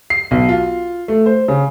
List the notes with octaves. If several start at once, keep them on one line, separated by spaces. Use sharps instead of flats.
C7
B1
F4
A3
C5
C#3